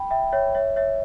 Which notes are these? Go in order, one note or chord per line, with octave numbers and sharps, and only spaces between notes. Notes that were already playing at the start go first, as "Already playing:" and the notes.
Already playing: G5 B5
E5 G5
C#5 E5
C#5 E5
C#5 E5